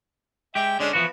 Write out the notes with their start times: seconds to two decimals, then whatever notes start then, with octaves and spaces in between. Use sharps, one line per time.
0.55 G#3 G4 E5 G5
0.80 D3 G#3 C#4 D4
0.93 E3 F3 B3 F#4